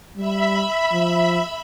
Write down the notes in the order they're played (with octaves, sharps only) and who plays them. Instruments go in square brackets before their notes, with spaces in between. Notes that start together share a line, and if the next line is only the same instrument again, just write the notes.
[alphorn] G3 [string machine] E5 B5
[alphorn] F3